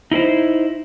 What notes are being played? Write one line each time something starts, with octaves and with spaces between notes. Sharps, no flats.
D#4 E4 B4 C5